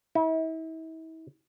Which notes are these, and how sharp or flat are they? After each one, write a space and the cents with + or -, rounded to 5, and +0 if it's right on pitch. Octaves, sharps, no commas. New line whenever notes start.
E4 -40